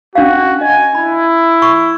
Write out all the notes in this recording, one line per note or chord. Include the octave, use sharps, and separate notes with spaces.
C#4 D4 F#4 F5
D#5 G#5
E4 B5
C#6